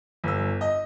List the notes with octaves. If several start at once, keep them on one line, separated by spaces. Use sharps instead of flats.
G1 E6
D#5